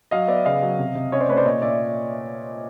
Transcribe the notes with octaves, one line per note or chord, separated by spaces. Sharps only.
F#3 D#5 F5
B3 D5 E5
C#3 D#5 F5
F#3
C3
C3
C#4 C#5 D#5
C5 D5
A3 B4 C#5
C5 D5
A#2 C#5 D#5
A#2 D5 E5